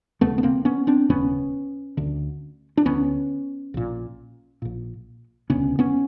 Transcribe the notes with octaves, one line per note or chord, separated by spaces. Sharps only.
E1 D#2 C#3 A3 B3
B3
A#3 C4
B3 C#4
C4 D4
E1 D#2 C#3 B3 C#4
D2 D3
D4
D2 D3 B3 C#4
A#1 A#2
A#1 A#2
E1 D2 C#3 B3 C#4
B3 C#4